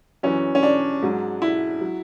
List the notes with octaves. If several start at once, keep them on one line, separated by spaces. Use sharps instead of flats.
F#2 E3 C#4
C#4
D4
G#2 F#3
E4
F#3